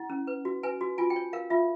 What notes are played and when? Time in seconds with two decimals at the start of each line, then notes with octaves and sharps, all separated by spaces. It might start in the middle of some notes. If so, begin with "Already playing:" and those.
Already playing: E4 F#5
0.10 C#4
0.27 B4
0.45 F#4
0.63 B4 G#5
0.81 F#4
0.98 F4 G#5
1.10 G5
1.16 C#5
1.33 A#4 F5
1.50 F4 E5